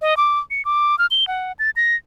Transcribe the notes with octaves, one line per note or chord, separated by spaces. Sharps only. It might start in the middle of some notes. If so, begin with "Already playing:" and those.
D#5
D6
C#7
D6
F6
G7
F#5
A6
A#6